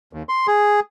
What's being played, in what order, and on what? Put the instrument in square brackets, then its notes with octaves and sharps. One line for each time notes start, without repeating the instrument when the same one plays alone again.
[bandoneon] D#2
C6
G#4